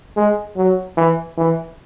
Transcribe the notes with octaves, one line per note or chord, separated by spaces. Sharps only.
G#3
F#3
E3
E3